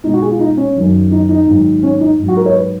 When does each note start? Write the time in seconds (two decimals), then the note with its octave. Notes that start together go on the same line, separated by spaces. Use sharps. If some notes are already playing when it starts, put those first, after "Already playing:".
0.04 B2 G#3 D#4
0.14 F#4
0.22 G#4
0.31 F4
0.39 D#4
0.57 C#4
0.76 F#2 D#3 F#3
1.11 D#4
1.29 D#4
1.47 G#2 D#3 F#3
1.83 C#4
2.01 D#4
2.18 G#2 F#3
2.28 F#4
2.37 A#4
2.46 C#5
2.54 B4